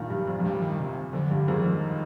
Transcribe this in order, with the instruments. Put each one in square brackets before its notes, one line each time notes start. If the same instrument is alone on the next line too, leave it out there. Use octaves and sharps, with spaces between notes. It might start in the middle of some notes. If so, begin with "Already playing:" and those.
Already playing: [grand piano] G2 A#2 D#3 G3
G2
F2
F2
[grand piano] G2 [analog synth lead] G3
[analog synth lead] D#3
C3
[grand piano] F2 [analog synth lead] D3
[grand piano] G2
[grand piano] F2 G#2 [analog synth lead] D#3
[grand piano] F2